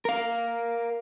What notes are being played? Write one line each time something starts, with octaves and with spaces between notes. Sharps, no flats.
A#4 F5